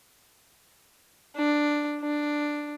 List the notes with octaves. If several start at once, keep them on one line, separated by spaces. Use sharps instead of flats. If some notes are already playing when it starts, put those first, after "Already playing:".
D4
D4